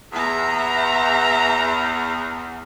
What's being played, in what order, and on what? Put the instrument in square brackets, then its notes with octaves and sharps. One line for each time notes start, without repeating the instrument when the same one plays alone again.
[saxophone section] E2 [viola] E5 A#5